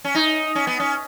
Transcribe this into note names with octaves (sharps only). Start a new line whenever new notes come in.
C#4
D#4
C#4
B3
C#4